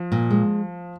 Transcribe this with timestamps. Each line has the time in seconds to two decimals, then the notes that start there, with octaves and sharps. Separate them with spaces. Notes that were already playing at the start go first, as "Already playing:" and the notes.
Already playing: F3
0.12 A#2
0.31 G#3